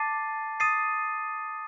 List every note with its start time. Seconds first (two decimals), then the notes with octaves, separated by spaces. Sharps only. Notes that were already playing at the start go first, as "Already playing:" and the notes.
Already playing: A5 D6 A6 C7 D#7
0.60 D#6 A6 C7 D#7